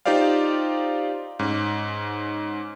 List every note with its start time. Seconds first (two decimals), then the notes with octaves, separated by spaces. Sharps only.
0.06 D#4 F4 G4 C5 D5 F5
1.39 G#2 C#4